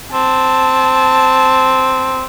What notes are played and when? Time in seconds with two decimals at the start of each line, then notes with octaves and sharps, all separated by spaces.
0.12 C4 A5